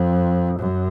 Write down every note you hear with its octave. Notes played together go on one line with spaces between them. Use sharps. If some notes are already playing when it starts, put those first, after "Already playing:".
Already playing: F2
F#2